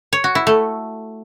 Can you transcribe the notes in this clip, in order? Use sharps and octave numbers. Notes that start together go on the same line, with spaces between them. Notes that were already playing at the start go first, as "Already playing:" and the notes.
C#5
F#4
E4
A3